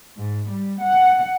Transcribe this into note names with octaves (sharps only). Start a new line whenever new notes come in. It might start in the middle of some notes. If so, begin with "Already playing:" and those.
G#2
G3
F#5